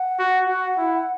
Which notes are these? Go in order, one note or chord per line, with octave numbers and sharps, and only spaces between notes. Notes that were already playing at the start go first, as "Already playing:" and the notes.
Already playing: F#5
F#4
F#4
E4